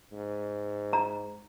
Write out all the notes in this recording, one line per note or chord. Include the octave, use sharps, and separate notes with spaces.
G#2
A#5